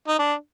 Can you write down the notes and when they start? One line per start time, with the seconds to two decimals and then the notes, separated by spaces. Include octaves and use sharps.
0.08 D#4
0.19 D4